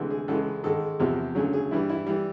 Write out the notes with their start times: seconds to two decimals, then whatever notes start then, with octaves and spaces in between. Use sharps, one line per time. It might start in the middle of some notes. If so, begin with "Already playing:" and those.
Already playing: D2 C3 E3 G#3
0.10 G#4
0.28 C#2 C#3 E3 G#3 A4
0.64 G#2 D#3 G#3 A4
0.99 E2 C3 F3
1.35 D2 C#3 F#3 G#4
1.53 G#4
1.71 G2 E3 G3 E4
1.89 E4
2.07 E3 G3